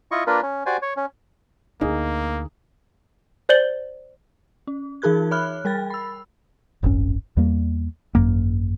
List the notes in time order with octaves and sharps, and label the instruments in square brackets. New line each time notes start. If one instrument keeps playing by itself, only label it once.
[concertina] E4 F4 D#5 C#6
A#3 D4 F4 A#4 B4
C#4
F#4 G4 C5 D5 G#5
C#5
C#4
[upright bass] D2 [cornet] A#3 [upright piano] D#4 G#4
[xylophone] C5 D5 G6 A6 F#7 G7
[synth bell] C#4
E3 D#4 G#4 A#4 F#6 G#6
C#5 E5 B5 F6 F#6
G3 A#4 G5 A6
B5 E6
[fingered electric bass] D#1 G#1 F#2 C#4
E2 G3 A#3
G#1 F#2 A#3